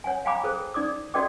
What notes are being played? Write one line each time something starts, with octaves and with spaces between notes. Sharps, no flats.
C#5 F#5 G#5
F5 G5 G#5 A#5 B5 D6
G#4 A4 C5
D#4 D5 D6 D#6
F#4 A4 D5 D#5 G5 D6